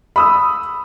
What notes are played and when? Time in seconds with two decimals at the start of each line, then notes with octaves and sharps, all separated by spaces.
0.16 B5 D#6 E6